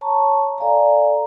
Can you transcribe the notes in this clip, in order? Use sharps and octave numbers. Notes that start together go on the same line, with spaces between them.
C#5 A5 A#5 C#6
A4 D5 F5 G#5 A#5